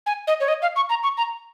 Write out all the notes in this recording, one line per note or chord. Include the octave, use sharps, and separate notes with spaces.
G#5
D#5
C#5
D#5
F5
C#6
A#5
C#6
A#5